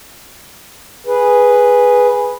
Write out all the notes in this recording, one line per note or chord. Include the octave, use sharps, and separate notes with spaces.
G#4 B4